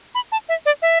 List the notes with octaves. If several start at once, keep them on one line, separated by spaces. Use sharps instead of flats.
B5
A5
E5
D5
E5